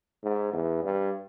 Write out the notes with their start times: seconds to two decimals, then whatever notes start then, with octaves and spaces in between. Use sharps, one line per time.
0.23 G#2
0.53 E2
0.83 G2